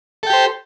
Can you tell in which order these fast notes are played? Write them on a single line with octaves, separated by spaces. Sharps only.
A4 G5 G4 C5